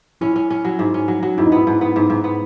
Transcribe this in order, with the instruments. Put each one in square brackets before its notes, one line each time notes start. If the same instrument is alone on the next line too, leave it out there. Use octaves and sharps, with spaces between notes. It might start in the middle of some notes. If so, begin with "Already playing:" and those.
[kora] C#4 [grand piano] E4
[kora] C#4
C#4
F#3
G#2
C#4
F#3
F#3
[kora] G#2 [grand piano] E4
[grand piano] D#4
[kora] B3 [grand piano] E4
[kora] G#2
B3
G#2
G#2
B3